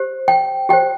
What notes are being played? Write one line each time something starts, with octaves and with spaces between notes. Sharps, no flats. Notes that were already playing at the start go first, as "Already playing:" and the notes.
Already playing: G4 C5
G5
G4 C5 G5